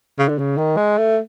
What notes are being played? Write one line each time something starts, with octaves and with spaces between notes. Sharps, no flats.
C#3
D3
C#3
D#3
G#3
A3